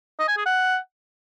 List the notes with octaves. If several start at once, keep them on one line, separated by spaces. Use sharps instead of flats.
D#5
G#5
G#4
F#5